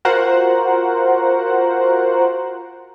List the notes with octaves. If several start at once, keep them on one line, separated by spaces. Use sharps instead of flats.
F4 F#4 A#4 C5 F#5